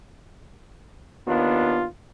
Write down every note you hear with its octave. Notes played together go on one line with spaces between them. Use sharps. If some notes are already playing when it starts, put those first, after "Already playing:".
D#2 B3 D4 F4